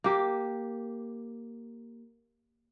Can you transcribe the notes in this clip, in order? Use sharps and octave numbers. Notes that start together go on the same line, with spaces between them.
A#3 G4